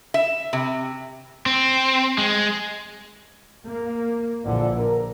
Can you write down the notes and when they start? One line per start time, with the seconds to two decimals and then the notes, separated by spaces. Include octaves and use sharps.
0.14 E5
0.53 C3
1.46 C4
2.18 G#3
3.66 A#3
4.45 A#1 D3 E3 F3
4.78 A#4